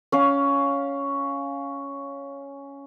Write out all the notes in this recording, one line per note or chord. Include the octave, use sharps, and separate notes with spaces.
C#4 F5